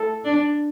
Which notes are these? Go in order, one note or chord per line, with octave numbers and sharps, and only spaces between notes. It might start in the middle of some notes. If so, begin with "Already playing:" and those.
Already playing: A3 E4 A4
D4